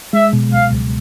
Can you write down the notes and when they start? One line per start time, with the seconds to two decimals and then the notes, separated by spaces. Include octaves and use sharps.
0.13 G#3 E5
0.33 B2
0.53 C#2 F5
0.73 C#2